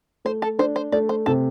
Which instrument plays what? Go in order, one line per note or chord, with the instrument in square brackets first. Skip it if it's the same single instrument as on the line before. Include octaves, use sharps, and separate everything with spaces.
[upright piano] A3 [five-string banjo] C5
[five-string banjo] A4
[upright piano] D4 [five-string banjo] C5
[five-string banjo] C5
[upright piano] A3 [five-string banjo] D5
[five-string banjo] C5
[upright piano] C3 [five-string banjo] A4